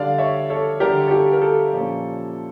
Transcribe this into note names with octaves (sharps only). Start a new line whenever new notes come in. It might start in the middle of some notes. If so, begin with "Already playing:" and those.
Already playing: D3 G3 D4 D5 F5
C#5 E5
A4 C#5
D3 G3 D4 G4 A#4
A4
G4
A#4
A4
A#2 F3 A#3 C#4